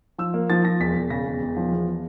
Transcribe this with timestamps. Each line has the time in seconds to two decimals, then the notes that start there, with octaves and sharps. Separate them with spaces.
0.18 F3 E6
0.34 A#3
0.50 F3 A6
0.64 F3 A#6
0.80 E1 B6
0.95 E1
1.10 C#3 A#6
1.25 E1
1.42 E1
1.56 F3
1.72 E2